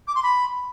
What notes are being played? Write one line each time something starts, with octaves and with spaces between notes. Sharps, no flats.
D6
C6
B5